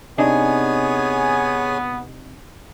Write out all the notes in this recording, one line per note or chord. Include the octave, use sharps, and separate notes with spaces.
C3 B3 D4 D#4 G#4 C#5 G#5